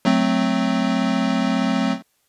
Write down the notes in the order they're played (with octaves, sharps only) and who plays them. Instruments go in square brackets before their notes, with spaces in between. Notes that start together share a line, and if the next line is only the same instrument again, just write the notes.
[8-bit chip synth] F#3 A3 C4